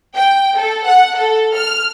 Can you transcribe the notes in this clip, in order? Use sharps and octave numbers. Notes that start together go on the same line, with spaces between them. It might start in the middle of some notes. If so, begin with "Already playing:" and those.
G5
A4
F#5
A4
F6